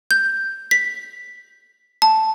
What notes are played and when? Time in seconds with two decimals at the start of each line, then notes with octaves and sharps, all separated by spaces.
0.11 G6
0.71 B6
2.02 A5